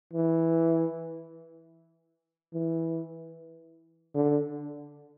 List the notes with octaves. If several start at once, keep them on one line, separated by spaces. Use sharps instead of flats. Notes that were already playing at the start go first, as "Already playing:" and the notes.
E3
E3
D3